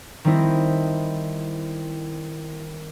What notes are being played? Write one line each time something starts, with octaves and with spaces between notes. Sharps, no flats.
D#3 G3 C4 E4 D#5